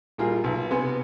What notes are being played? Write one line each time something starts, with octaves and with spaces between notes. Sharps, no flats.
A#1 G3 F4 G#4 A#4
B1
C3 B3 G#5